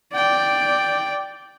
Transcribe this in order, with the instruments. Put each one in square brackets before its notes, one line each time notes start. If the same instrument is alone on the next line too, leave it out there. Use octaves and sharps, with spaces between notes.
[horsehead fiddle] D5 G5